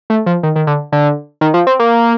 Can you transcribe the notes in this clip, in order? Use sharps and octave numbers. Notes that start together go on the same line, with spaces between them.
A3
F3
D#3
D#3
D3
D3
D#3
F3
C4
A#3